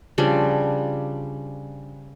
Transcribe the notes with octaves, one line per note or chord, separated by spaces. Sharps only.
C#3 F3 G3 D4